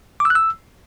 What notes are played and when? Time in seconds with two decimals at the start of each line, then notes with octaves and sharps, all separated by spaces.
0.20 D6
0.25 E6
0.30 F#6
0.35 E6